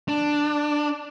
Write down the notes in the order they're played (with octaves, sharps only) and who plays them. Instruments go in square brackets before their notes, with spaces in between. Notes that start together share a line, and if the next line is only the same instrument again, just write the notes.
[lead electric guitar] D4